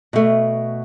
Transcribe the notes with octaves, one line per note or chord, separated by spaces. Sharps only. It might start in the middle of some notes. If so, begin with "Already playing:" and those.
B2 A3